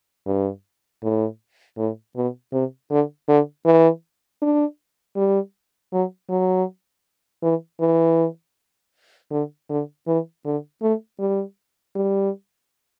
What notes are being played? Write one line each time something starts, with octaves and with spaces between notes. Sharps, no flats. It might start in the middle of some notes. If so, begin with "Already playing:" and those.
G2
A2
A2
B2
C3
D3
D3
E3
D4
G3
F#3
F#3
E3
E3
D3
D3
E3
D3
A3
G3
G3